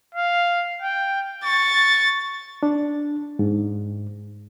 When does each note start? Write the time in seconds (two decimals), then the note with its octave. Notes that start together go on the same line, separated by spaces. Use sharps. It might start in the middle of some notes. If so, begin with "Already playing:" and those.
0.15 F5
0.82 G5
1.44 C#6 A6
2.63 D4
3.39 G#2